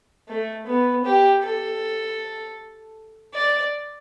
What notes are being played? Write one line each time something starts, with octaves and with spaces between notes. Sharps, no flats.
A3
B3
G4
A4
D5